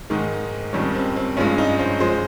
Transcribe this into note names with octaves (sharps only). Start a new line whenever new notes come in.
G#2 D#3 G#3 D#4
F2 D#3 G3 C#4
C4
C4
G2 F3 G#3 C#4
D#4
C5
F3 G#3 C5